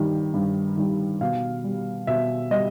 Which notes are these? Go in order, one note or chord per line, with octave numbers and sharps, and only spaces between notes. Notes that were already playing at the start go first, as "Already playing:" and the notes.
Already playing: G2 D#3 G3
G2
D#3 G3
B2 F5
G3
B2 E5
G3 D#5